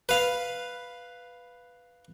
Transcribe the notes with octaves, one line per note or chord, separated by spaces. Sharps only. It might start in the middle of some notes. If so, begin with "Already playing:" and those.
B4 F5